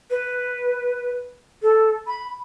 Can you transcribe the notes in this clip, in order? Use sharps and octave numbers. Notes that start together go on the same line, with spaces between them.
B4
A4
B5